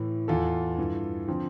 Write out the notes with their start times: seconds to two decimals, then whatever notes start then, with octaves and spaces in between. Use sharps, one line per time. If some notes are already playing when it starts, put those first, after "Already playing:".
Already playing: A2 E3
0.28 E2 E3 F4 A4
0.78 G2 E3
1.28 D3 F3 C4